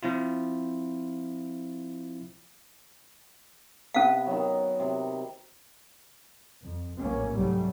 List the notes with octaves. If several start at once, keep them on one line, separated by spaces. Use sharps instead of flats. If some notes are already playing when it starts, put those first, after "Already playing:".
F3 C4 E4 F4
C3 B3 C#4 F5
D#3 F#3
C3
F2
A#1 A2 F#3 A#3 C#4
C2 G#2 F#3 G3 A3